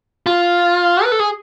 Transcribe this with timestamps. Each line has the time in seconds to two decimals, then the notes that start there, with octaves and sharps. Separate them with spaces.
0.26 F4
1.04 B4
1.12 A4
1.20 G#4